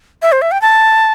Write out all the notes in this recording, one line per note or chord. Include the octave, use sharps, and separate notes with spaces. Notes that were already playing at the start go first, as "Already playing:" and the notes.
E5
C5
E5
G5
A5